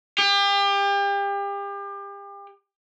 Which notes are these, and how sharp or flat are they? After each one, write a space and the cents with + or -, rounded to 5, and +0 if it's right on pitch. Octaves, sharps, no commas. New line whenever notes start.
G4 +35